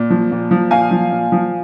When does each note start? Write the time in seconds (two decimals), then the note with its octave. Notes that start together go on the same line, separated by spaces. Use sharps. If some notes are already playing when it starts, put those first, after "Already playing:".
Already playing: A#2
0.10 F3
0.32 A#2
0.51 F3
0.71 A#2 F5 G#5
0.91 F3
1.12 A#2
1.32 F3